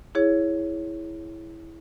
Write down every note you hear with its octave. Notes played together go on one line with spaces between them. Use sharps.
E4 G#4 C#5